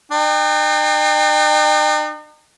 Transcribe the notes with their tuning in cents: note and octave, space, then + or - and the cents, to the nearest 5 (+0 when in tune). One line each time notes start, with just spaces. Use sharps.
D#4 -45 G5 +30